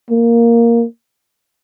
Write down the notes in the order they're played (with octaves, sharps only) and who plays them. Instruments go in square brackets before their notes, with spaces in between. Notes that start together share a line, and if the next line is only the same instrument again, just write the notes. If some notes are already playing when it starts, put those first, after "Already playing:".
[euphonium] A#3